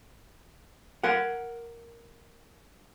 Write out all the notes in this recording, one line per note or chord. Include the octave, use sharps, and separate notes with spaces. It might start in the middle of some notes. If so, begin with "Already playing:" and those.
A#4 F#5